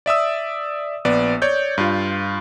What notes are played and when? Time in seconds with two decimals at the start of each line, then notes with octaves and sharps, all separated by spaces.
0.06 D5 E5 D#6 E6
1.05 A#1 B3 D5
1.42 C#5 D5 G6
1.78 G2 F4